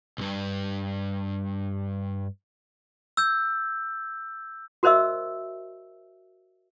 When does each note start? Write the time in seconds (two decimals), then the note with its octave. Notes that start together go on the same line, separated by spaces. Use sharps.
0.18 B1 G2
3.17 E6 G6
4.83 F#4 A#4 C5 D#5 E5 E6